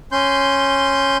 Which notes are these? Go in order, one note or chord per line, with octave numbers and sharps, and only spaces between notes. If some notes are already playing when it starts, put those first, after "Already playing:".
C#4 C6 G6